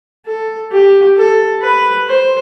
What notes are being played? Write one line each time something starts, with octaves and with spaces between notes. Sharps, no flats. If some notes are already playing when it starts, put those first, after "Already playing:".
A4
G4
A4
B4
C5